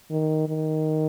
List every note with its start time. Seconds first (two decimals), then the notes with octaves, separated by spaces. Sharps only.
0.11 D#3
0.49 D#3